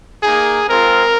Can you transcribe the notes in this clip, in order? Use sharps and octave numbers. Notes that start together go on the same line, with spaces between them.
A#3 D#4 G#4
G#3 C4 F4 A#4